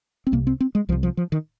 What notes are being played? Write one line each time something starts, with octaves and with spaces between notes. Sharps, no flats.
C4
C2 C3 A#3
C4
C4
G#3
C2 C3 F3
F3
F3
D#3